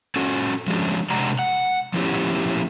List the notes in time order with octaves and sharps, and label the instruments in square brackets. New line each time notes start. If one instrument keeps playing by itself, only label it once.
[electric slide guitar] C#4 F#4 A4
F3 F#3 G#3 C#4 D4
C3 G#3 D4 F#5 A#5
F#5
F3 A3 B3 C#4 E4 G4